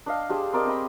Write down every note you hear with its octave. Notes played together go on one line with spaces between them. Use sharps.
D4 D#5 F5
D4 G4 G#4 C5
C4 A#4 D5 D#5
C4 D#5 B5